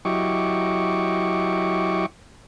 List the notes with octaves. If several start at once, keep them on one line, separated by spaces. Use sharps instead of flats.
F#3 E4 G4 D#5 C#6 D6